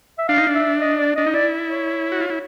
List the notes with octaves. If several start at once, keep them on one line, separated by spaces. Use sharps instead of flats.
E5
D4 F5
D#4
D4
E5
D#5
D5
D4 D#5
D#4
E4 D5
C#5
F#4
F4
E4